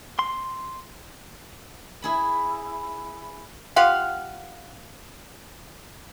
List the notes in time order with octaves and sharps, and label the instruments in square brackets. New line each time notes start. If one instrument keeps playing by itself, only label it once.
[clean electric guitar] C6
[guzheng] E4 G#4 B5
[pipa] F4 G4 F5 F#5